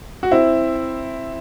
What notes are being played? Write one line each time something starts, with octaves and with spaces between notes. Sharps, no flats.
F#4
C4 E4